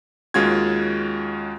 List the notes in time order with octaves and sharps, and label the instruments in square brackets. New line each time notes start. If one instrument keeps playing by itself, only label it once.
[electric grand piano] D#2 G#3 C#4 F4 F#4 G#6